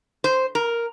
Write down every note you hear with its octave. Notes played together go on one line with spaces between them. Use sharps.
C5
A#4